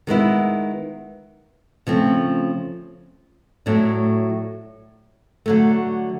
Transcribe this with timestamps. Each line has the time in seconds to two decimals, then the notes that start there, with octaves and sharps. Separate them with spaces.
0.07 D#3 G#3 B3 E4
1.87 C#3 F3 A3 C4
3.66 A2 F#3 A3 D4
5.46 D3 F#3 A3